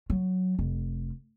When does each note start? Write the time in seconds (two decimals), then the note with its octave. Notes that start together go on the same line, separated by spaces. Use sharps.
0.10 F#3
0.59 F1